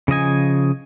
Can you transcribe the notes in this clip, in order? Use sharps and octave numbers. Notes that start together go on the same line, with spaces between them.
C#3 F3 D#5 G#5